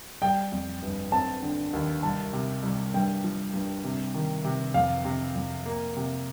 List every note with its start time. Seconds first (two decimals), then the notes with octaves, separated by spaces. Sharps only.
0.22 G3 G5
0.52 F2
0.83 G1
1.12 C4 A5
1.42 D3
1.73 D#2
2.03 C2 A5
2.33 C3
2.63 C2
2.94 G2 G5
3.24 F3
3.54 G2
3.84 C3
4.14 D#3
4.44 C3
4.74 F2 F5
5.05 C3
5.36 F2
5.66 A#3
5.96 C3